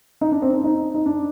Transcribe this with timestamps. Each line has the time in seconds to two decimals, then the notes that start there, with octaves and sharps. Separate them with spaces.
0.21 D#4
0.32 D4
0.42 C4
0.53 D#4
0.64 D#4
0.94 D#4
1.06 D4